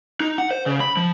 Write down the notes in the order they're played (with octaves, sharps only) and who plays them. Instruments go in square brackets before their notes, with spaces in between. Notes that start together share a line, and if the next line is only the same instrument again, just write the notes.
[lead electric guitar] D#4
F#5
C5
C#3
B5
F3